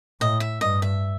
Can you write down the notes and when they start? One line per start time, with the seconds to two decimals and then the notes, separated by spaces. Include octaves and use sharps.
0.21 A2 D#5
0.40 E5
0.61 G2 D#5
0.82 E5